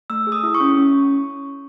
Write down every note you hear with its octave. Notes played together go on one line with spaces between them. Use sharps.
A3 E6
G#4
D#6
E4
C#6
C#4
C#4